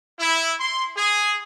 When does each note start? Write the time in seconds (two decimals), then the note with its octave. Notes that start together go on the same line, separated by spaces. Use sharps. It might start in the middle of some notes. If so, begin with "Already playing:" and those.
0.19 E4
0.60 C6
0.97 G#4